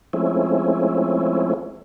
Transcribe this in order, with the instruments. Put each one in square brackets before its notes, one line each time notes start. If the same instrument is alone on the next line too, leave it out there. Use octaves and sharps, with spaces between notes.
[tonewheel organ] F3 G#3 A3 C4 C#4 E4